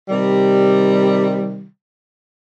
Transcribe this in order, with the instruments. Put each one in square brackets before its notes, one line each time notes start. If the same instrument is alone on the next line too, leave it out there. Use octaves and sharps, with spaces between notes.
[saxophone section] C3 D#3 G3